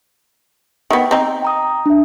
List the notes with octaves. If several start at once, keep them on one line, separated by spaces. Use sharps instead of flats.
D#3 B3
C4 D#4
G5 A#5 D#6
D4 E5